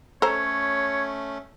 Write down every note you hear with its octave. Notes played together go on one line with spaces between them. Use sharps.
A3 C#4 A4 C5 C#5 A#5